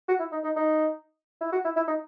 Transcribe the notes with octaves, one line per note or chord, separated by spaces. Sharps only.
F#4
E4
D#4
D#4
D#4
E4
F#4
E4
E4
D#4